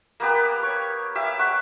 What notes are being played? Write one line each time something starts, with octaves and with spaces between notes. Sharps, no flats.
A#3 B3 G4 B4
C#5
G4 E5 F5
F#5 C#6